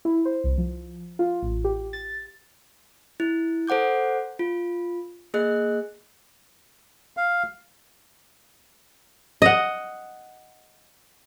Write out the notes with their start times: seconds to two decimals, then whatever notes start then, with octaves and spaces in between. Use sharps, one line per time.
0.05 E4
0.25 C5
0.44 C2
0.58 F3
1.19 F4
1.42 A1
1.64 G4
1.93 A6
3.20 E4
3.67 A4 C5 F#5 D6 G6
4.39 F4
5.34 A#3 G#4 D#5 F#6
7.17 F5
9.42 D#5 F#5